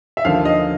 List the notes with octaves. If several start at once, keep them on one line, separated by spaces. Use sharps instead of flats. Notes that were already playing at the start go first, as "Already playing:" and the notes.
E5
D#2 D3 F3 F5
D#5